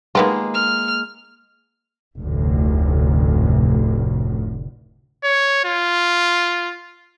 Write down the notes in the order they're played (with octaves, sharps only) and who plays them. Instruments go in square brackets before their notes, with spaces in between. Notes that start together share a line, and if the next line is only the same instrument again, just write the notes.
[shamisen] D#3 B3 F4 [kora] G#3 A#3
[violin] F6
[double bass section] F1 D2 A2
[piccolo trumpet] C#5
F4